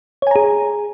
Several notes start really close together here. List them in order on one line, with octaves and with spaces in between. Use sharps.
C#5 G#5 A#5 G#4